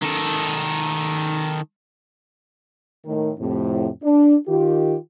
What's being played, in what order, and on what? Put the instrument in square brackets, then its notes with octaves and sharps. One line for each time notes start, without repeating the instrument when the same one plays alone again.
[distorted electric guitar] D#3 A4
[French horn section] A2 D#3
F2 A2 C3
D4
D#3 F4 G4